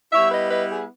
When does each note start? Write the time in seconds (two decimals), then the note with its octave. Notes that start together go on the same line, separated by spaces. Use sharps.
0.12 G3 B3 E4 C#5 E5
0.31 B4 D#5
0.50 B4 D#5
0.69 G#4